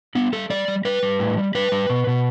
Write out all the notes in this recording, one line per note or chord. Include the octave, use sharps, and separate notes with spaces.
G3 B3
G3 A4
G3 D5
G3
G3 B4
G3
A2
G3
G3 B4
G3
B2
B2